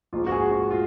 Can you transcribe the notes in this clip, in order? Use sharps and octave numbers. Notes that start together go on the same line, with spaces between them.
A#1 G#2 F3 G#3 F4
F#4
G#4
F#4
F4